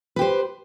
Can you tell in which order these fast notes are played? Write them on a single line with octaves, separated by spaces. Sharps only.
B4 G4 C5